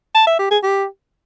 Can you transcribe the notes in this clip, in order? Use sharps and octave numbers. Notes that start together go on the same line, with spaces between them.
A5
E5
G4
G#4
G4